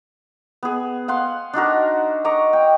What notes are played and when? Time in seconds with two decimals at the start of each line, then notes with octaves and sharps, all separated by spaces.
0.63 B3 G#4
1.08 F5 F#5 C6
1.53 D4 D#4 F#4 A#4
2.25 D#5 A#5 C#6 D6
2.53 G5